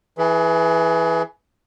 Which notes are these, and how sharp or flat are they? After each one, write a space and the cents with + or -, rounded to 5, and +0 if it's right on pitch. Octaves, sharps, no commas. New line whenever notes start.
E3 +0 G#4 +25